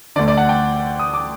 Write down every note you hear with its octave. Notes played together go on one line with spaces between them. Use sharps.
D2 D3 D5
D5
F#5
G5
D#6
D6